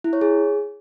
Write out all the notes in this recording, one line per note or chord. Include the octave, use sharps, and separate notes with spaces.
E4
C#5
G#4